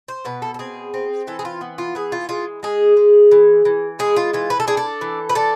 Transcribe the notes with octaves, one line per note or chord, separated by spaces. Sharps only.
C5
B2 B4
A4
A4
C4 G#4
C4
E3 A4
G#4
F4
B3
F4
E3 G#4
F4
G#3 F4
G#3 G#4
G#3
E3
E3
G#3 G#4
F4
E3 F4
B4
A4
D4 G#4
A4
E3
B4
D4 A4